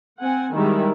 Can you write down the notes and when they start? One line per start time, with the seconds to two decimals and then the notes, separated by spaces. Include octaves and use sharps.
0.21 C4 F#5 G#5
0.53 D#3 G3 G#3 E4